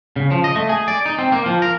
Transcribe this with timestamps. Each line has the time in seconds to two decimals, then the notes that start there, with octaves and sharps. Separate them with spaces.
0.16 C#3
0.31 F3
0.44 D#5
0.56 A3
0.69 G#4
0.88 D5
1.06 D#4
1.19 C4
1.32 A#3
1.46 F3
1.62 A#4